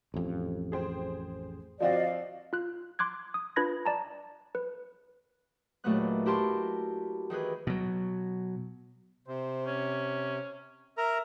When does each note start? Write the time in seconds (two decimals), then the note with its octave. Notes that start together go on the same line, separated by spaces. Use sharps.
0.14 A1 F2
0.72 G#4 C5 G5
1.80 F3 C4 F#4 D5 D#5 F5
2.53 F4 F#6
2.99 C6 D6 F#6 G#6
3.34 D#6
3.56 D4 F4 B4 B5 G#6 A#6
3.86 D5 A5 A#5
4.55 B4
5.84 D#2 A#2 F#3 A3 B3 F#6
6.26 E4 F#4 G4 A#4 A5 C6
7.30 D#3 E3 G#4 B4
7.67 B2 F#3
9.28 C3 C5
9.66 C#4
10.98 A#4 E5 A#5